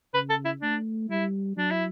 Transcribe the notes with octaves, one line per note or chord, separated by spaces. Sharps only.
C#3 B4
A4
E4
A3 D4
G3 E4
F#3 D4
E4